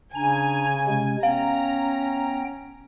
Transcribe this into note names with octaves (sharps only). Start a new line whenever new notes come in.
C#3 D4 G#5 A#5
C3 G#3 C#4
B3 C#4 F5 G5 A#5